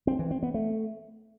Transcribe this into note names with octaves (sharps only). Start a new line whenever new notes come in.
C4
E3
C4
B3
A3